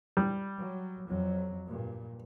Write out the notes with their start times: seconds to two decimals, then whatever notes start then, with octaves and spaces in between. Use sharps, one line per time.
0.17 G3
0.58 F#3
1.07 F2 F#3
1.66 G2 A#2